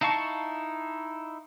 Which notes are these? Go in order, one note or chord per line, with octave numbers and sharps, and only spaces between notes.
D#4 E4 F5 A5 C#6